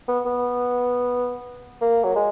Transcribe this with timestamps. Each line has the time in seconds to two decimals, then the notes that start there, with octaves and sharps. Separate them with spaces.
0.08 B3
0.26 B3
1.81 A#3
2.04 F#3
2.16 G#3